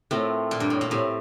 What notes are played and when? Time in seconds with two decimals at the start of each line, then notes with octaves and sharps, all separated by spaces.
0.11 A2 A3 C4 F4 A#4
0.51 A#2
0.60 G2
0.70 A2
0.81 A#2
0.90 A2 A3 C4 G4